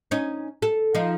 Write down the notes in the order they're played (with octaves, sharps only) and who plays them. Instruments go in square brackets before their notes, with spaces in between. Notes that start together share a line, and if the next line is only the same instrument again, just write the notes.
[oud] C#4 D#4
A4
F3 D#4